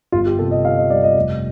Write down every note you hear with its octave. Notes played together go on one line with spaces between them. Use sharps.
G1 F4
G4
C3 A4
D#5
G3 F5
D#5
G3 D5
D#5
F1